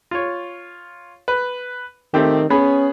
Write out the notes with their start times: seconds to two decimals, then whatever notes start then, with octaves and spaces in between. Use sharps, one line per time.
0.11 F4 C#5
1.28 B4
2.14 D#3 A3 C4 G4
2.50 B3 C#4 G#4 B5